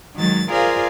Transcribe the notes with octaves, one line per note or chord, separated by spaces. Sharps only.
D#3 F#3 G#3 A6
F4 G#4 A#4 C5 D5 F5